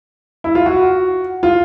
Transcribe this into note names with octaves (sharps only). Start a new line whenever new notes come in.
E4
F4
F#4
F4